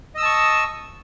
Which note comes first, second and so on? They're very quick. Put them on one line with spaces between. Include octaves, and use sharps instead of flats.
D#5 E6 D#6 A5 C#6